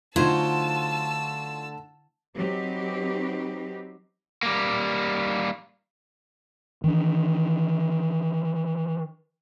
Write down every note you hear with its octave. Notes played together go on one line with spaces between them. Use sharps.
D3 F#3 A3 D#4 F4 C5 A5 E6
F#3 C4 D#4 G4 B4
G3 A#3
D#3 E3 D4